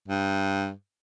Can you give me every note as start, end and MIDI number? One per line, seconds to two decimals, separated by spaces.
0.08 0.71 43